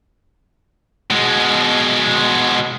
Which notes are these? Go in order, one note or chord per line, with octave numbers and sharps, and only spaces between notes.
B2 G#3